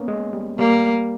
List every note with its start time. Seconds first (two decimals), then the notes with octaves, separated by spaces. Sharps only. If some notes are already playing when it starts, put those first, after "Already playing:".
Already playing: A#3 B3 C#4
0.08 G#3
0.33 G3
0.59 G3 A#3